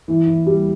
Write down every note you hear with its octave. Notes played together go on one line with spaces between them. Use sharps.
E3
E3
G3